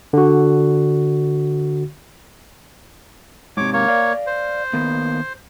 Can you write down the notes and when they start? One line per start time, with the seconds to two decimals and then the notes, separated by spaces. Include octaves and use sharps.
0.13 D3 F#4
3.57 G#2 C3 C#5 D6
3.73 A#3 C#5
3.88 D5 F5
4.27 C5
4.73 D#3 A#3 B3